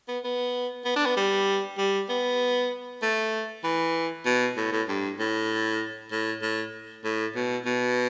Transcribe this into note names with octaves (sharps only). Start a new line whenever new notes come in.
B3
B3
B3
D4
B3
G3
G3
B3
A3
E3
B2
A2
A2
G2
A2
A2
A2
A2
B2
B2